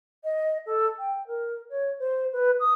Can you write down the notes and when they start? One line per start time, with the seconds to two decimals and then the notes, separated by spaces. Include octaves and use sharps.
0.24 D#5
0.66 A4
0.99 G5
1.27 A#4
1.70 C#5
1.99 C5
2.33 B4
2.60 D#6